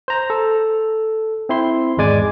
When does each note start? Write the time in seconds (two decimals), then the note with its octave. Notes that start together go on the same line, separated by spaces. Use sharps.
0.08 C5 A#5
0.30 A4
1.49 C4 E4 C6
1.97 G#1 E2 G#3 D5 G#5 D6